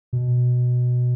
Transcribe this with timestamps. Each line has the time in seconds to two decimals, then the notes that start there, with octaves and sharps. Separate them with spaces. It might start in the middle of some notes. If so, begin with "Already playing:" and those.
0.13 B2